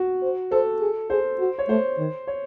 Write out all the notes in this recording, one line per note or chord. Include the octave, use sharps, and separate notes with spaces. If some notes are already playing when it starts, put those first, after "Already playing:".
Already playing: F#4
C5
A4 C5
G#4
G#4 C5
F#4
C#5
A3 C5
D#3
C#5